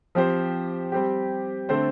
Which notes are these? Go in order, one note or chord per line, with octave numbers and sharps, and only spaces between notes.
F3 C4 G4 C5
G3 C4 G4
D3 A3 C4 A4 C5